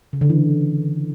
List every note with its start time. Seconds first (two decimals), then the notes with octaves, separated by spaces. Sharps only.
0.13 C#3
0.21 D3
0.30 E3